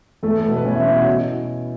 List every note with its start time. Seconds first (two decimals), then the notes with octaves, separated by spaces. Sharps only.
0.23 E2 A3 A4
0.39 A4
0.44 B3 B4
0.48 B2
0.56 B4
0.64 E2 C#4 C#5
0.75 E4 E5
0.85 B2 B3 C#4 C#5
0.96 F#4
1.07 B2 E4